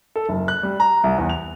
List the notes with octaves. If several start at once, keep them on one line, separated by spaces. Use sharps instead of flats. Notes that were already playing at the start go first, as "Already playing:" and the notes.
A4
F#1
F#6
G3
A#5
C2
E2
F7